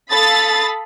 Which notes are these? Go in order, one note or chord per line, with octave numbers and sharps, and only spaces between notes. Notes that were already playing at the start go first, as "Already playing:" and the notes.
A4 F5 B5 D#6 A6